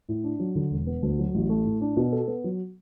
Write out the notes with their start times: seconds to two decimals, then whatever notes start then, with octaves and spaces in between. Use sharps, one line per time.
0.09 A2
0.24 D4
0.39 F#3
0.55 D3
0.71 E1
0.87 B3
1.02 D2
1.19 F#3
1.34 A1
1.49 A3
1.65 A2
1.81 D4
1.97 B2
2.12 A4
2.27 B3
2.44 F#3